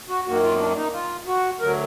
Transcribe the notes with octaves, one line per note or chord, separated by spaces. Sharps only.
F#4
F#2 D#3 A#3 F#4
F4
B3
D4
D4
D#4
F4
F#4
D2 D3 F#3 A#4